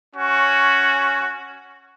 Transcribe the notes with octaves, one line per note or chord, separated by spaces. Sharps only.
C#4 F#4